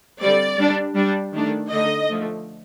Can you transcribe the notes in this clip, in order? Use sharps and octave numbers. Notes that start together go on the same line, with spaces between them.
D3 G3 C4 D5
G3 D4
G3 D4
D#3 A3 D4
D3 A3 D#4 D#5
D3 F3 A3